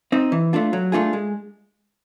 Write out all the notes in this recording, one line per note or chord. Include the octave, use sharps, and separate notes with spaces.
C4 D#4
E3
A3 D4 F4
F#3
A3 D4 F4 G#4
G#3